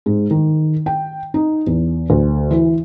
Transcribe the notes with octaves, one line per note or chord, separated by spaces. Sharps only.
G#2
D#3
G5
D#4
E2
D2
E3